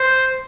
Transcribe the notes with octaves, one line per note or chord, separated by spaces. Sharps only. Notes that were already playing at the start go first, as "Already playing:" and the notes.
Already playing: C5